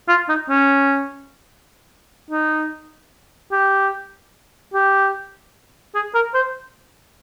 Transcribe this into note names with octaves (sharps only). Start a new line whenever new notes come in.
F4
D#4
C#4
D#4
G4
G4
G#4
A#4
C5